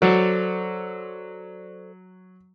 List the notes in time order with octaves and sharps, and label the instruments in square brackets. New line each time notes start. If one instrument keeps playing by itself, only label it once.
[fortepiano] F#3 [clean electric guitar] A4 C5 D5